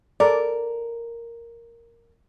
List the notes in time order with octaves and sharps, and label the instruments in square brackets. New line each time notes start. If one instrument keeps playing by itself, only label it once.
[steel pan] A4 D5 [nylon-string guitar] A#4